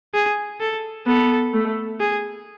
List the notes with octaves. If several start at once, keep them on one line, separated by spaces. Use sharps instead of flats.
G#4
A4
B3 A4
A3
G#4